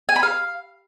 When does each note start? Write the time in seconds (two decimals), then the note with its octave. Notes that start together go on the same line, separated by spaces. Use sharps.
0.09 G#5
0.16 B5
0.23 F5